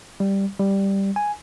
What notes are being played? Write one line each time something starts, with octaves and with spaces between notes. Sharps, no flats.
G3
G3
G#5